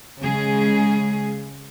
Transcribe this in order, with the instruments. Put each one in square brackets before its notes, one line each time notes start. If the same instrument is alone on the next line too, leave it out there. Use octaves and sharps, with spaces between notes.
[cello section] C#3 G#3 G#4